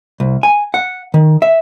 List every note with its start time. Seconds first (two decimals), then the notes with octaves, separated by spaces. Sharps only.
0.20 C2
0.43 G#5
0.74 F#5
1.14 D#3
1.42 E5